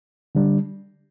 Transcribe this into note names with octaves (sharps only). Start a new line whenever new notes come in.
D3 G3 D4